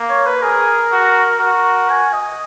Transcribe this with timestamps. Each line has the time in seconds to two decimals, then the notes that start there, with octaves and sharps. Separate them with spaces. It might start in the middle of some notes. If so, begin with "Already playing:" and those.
Already playing: A#3
0.10 C#5
0.26 B4
0.41 G#4 A#4
0.91 F#4
1.39 F#4 A#4
1.90 G#5
2.13 D#5